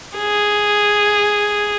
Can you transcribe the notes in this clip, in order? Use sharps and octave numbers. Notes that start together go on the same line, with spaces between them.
G#4